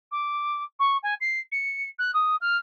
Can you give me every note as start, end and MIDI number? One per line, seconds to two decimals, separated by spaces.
0.11 0.63 86
0.79 0.97 85
1.03 1.14 80
1.21 1.39 96
1.52 1.88 97
1.99 2.11 90
2.14 2.36 87
2.41 2.57 89